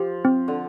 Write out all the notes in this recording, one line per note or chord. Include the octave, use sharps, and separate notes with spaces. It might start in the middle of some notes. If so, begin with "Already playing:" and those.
Already playing: F3 G4
C4
D3